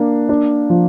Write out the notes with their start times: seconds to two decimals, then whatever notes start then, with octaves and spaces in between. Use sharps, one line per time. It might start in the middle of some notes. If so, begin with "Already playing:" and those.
Already playing: A#3 D4
0.29 D4
0.70 F3